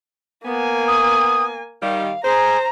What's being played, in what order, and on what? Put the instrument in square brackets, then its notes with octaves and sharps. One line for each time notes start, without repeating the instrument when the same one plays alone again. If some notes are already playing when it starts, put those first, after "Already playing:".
[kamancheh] A#3 G#5 [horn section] B3
[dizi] D#6
[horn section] D#3 G3 [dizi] F5
[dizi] G#4 [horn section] C5 [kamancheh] A#5